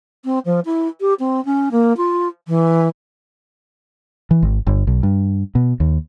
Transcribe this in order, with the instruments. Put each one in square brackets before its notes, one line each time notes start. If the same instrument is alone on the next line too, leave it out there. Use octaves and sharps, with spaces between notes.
[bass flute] C4
F3
E4
G4
C4
C#4
A#3
F4
E3
[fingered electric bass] E3
G#1
G1
B1
G2
B2
D#2